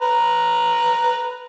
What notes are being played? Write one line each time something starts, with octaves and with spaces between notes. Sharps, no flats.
B4 A#5